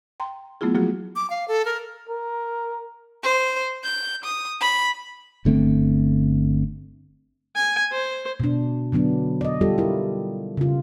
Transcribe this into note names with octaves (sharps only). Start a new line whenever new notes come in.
G5 A#5 C6
F#3 A3 B3 E4 F4 G#4
F3 F#3 A#3 F4 F#4 G#4
D6
F5
A4
A#4
A#4
C5
G6
D#6
B5
G1 D3 A3 C4
G#5
C5
B2 D4
D3 F#3 B3 D4
D5 D#5
G3 F4 G4 A4
E4 A#4
C#3 F4